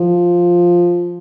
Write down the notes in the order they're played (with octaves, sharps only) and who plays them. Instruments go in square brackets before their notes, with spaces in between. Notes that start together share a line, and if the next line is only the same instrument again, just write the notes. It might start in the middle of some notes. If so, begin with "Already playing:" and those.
Already playing: [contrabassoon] F3